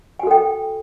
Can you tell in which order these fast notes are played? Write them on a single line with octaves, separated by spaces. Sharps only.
G#5 F#4 A4 G5